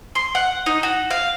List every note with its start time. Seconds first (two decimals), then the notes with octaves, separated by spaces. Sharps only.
0.15 C6
0.35 F#5
0.66 D#4
0.83 F#4
1.10 F5